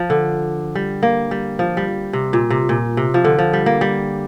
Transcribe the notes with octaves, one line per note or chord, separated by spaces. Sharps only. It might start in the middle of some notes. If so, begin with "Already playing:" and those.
Already playing: F3
D3
G3
A#3
G3
F3
G3
C3
A#2
C3
A#2
C3
F3
D3
F3
G3
A#3
G3